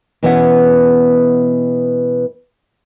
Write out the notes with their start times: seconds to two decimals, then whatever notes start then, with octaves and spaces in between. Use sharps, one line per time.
0.23 B2 E3 B3 C#4 G#4 F#5